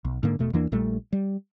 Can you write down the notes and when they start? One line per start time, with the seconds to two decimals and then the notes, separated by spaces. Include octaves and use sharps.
0.05 B1
0.23 G#2 D3 A#3
0.39 E1 B2 A3
0.53 E2 E3 A#3 D4
0.72 A#1 A#2 G3 A3
1.13 G3